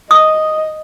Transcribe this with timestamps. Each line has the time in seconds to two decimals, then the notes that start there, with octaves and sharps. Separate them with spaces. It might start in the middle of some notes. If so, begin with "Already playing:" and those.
0.11 D#5 D#6